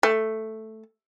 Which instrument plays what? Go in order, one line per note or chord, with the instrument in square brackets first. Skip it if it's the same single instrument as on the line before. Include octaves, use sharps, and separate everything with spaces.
[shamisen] A3